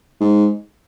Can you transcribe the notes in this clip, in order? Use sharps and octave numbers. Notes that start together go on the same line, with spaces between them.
G#2